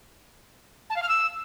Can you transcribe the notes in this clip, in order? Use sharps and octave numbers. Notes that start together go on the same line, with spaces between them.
A5
F5
F6
E6